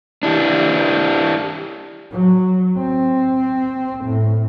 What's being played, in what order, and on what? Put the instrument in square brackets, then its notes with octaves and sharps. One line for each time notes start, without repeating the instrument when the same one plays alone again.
[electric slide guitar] D4 E4 G4
[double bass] F#3
C4
A2